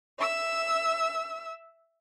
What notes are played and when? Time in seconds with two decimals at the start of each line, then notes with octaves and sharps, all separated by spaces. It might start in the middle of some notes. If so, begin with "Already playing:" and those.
0.18 E5 E6